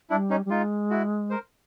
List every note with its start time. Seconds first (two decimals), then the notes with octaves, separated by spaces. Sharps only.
0.10 G3 D4 E4
0.30 C#4 D#4
0.45 G3
0.50 G#3 D#4 F4
0.90 E4 F#4
1.30 A#4 C5